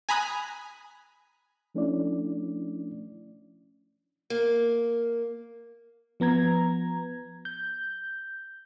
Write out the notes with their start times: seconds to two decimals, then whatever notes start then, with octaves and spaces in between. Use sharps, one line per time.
0.09 G#5 A#5 B5 D#6 F#6
1.75 F3 A3 C#4 D4 E4 D5
4.30 A#3
6.20 F3 B3 A#5 G#6
7.45 G6